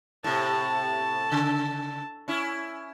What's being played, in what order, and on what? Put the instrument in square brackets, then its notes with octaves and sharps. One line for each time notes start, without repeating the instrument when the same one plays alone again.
[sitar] A2 C3 [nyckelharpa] A5
[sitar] C#3
C#4 E4